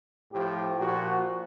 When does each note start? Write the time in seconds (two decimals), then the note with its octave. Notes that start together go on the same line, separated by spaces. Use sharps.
0.31 A2 F3 G4
0.78 A#2 F3 F#4